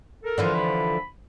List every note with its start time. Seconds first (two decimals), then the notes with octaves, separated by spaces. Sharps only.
0.23 A4 A#4
0.38 D3 E3 F3
0.54 B5